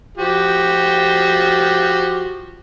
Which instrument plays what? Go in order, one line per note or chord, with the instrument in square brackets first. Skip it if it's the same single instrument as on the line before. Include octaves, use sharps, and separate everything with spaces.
[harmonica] F3 F#4 G4